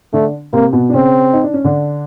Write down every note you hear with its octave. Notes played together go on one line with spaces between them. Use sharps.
D3 A3 D4
C3 A#3 C4
B2 B3
D4
C#3 C4 C#4
D#4
D4
C#4
D3 D4